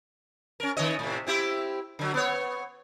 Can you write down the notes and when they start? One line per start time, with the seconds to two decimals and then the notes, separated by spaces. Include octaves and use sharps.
0.60 C#4 A#4
0.77 D#3 C#5 D#5
0.99 A2 C3
1.27 C4 E4 G4
1.99 D3 F#3
2.14 B3 C#5